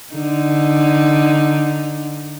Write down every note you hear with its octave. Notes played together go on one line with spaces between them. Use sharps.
D3 D#4